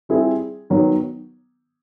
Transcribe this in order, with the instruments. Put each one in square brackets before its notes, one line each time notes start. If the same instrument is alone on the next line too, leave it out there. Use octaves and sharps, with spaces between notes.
[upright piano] G3 C4 E4 G#4
D#3 F#3 B3